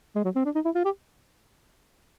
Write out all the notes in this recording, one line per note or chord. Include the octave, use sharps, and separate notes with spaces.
G#3
F#3
C4
D4
D#4
E4
F4
G4